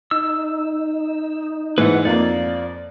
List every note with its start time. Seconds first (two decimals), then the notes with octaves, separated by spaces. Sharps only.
0.11 D#4 E6
1.78 G#2 E3 B4 F#5
2.05 F2 F3 A#3 D5